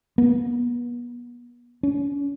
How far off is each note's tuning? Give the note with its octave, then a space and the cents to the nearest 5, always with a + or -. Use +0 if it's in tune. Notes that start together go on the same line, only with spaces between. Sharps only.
B3 -35
C#4 +35